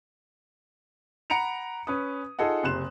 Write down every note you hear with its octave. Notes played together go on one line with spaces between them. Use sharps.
F#5 A#5 B5 C#7 D7 F7
C#4 B4 D#6
D#4 F4 G#4 A4 D#5 F#5
F#1 C3 C6 F#6 E7